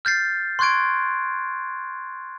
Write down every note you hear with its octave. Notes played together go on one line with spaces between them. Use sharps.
F6 G6 A6 C7
C6 C#6 F#6 G#6 D7